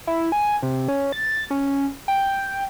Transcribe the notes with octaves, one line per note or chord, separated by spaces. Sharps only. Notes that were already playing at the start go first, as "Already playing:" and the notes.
E4
G#5
C3
C#4
A6
C#4
G5